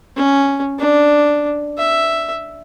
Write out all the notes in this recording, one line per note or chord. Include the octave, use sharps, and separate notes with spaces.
C#4
D4
E5